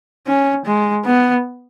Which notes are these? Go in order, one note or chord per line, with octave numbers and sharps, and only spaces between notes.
C#4
G#3
B3